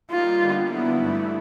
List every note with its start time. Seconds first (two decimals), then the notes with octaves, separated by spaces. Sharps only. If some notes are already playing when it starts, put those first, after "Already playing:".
0.11 G3 A#3 D#4 F4
0.40 D3 G3 B3
0.70 D3 F#3 B3 E4
0.99 G2 E3 A3